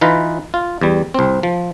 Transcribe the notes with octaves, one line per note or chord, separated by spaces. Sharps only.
E3 D#4 F4 B4 D#5
F4
E2 G3
C2 C4
F3